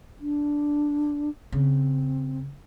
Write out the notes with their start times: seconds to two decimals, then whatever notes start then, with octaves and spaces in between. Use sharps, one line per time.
0.20 D4
1.52 C#3 C4